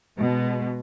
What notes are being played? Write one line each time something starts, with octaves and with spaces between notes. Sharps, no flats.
B2 G#3